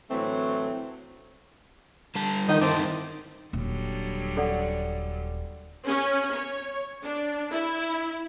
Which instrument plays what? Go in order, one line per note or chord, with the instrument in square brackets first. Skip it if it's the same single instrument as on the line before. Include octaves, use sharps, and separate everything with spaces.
[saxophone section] D2 A2 E3 F#3 A3 C4
[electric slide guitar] D3 G3 A5
[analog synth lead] D#3 [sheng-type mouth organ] D#4 D#6 G6
[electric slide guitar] G2 D#4 E4 [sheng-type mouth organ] C4 A5 D6
[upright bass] D#1 [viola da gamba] D3 F#3 G3
[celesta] A4 D5 F#5
[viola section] C#4
C#5
D4
E4